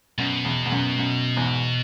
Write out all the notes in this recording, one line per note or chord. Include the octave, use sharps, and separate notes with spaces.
F#2 B2
E2
E2
F#2
F#2
E2 G#2